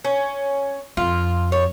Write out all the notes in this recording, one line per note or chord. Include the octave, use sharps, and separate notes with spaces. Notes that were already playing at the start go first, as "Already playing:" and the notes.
C#4
F2 F4
C#5